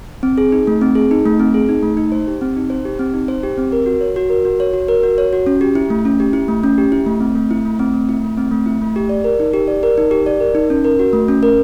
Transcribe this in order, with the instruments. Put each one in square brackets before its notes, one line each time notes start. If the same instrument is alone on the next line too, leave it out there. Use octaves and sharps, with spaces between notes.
[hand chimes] C4
G#4
D#4
A3
C4
G#4
D#4
A3
C4
G#4
D#4
A3
D#4
C5
G4
C4
D#4
C5
G4
C4
D#4
C5
G4
C4
A#4
F#4
C#5
F#4
A#4
F#4
C#5
F#4
A#4
F#4
C#5
F#4
C#4
G4
E4
A3
C#4
G4
E4
A3
C#4
G4
E4
A3
C4
A3
E4
A3
C4
A3
E4
A3
C4
A3
E4
A3
G4
D5
A#4
D#4
G4
D5
A#4
D#4
G4
D5
A#4
D#4
C#4
A#4
F#4
A3
C#4
A#4